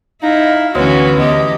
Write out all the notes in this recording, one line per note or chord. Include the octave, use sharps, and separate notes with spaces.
D#4 E4 F5
D2 E3 B3 C#4 F#4 C#5
E2 G4 D#5